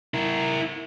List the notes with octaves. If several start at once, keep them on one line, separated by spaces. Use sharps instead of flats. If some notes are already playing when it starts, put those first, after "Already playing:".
E4 A#4